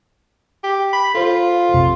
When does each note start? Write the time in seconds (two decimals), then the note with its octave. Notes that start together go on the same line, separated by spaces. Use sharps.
0.63 G4
0.93 B5
1.14 F4 A4 C5
1.74 A#1 F2 C3